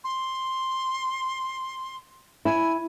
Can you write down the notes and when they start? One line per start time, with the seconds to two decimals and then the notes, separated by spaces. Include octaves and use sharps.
0.04 C6
2.45 E4 G#5